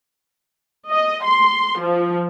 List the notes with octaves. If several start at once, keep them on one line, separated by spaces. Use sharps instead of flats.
D#5
C6
F3